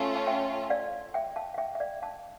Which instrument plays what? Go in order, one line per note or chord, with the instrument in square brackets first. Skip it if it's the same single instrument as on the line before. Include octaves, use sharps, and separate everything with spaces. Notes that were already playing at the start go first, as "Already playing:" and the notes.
Already playing: [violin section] A3 C#4 F4
[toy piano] A5
E5 G5
D5 F5
E5 G5
F5 A5
F5
E5 G5
E5
D5 F5
F5 A5